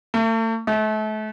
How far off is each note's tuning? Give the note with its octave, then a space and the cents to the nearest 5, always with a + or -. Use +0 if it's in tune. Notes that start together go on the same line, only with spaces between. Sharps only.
A3 +40
A3 -35